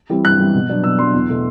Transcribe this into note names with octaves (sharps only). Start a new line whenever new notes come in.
E3 G3 C4
G2 F#6
E3 G3 C4
B2
F#3 B3 D4
B2 E6
F#3 B3 D4 C6
E2
B2 A3